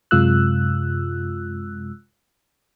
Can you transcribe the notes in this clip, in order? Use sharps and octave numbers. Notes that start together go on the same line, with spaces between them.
F#2 C3 G#3 F4 E6 F#6